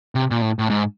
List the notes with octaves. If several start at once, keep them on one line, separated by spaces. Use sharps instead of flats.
C3
A#2
A2
A2
G#2